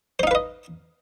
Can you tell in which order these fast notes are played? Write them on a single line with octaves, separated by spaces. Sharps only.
C5 D#4 F5 B4 D#5